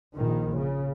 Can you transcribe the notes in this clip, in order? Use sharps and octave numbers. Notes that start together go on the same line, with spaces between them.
A#1 D#3
C#3